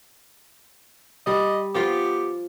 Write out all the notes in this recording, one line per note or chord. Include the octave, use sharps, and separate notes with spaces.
G3 D5 D#5
F3 B3 F4 G4